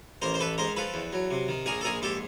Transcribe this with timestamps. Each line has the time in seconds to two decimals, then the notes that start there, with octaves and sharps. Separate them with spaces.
0.22 A1 A#4 C5
0.34 C5
0.40 A1 A4 B4
0.58 G#2 A#4 C5
0.77 F3 A4 B4
0.94 E2
1.13 F#3
1.31 C3
1.48 D#3
1.66 A#1 G#4 A#4
1.81 A4
1.84 A#1 G#4 A#4
2.02 G#2 G4 A4